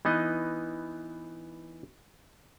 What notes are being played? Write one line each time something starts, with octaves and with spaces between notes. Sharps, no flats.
E3 B3 D#4 D#5